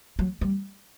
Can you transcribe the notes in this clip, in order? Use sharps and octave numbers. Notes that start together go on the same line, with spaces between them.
F#3
G3